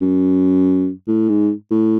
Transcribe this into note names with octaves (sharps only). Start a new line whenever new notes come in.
F#2
A2
G#2
A2